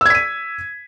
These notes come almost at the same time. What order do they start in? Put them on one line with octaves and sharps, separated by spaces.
E6 G#6 B6 D#7